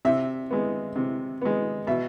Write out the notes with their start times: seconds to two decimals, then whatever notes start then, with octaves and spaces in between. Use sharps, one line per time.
0.05 C3 E5
0.51 G#3 B3
0.96 C3
1.42 G#3 B3
1.87 B2 E5